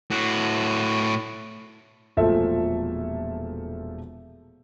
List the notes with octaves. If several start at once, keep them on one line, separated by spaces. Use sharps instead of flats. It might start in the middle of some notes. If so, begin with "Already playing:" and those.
A2 F#4
E1 A#2 F3 A3 A4 E5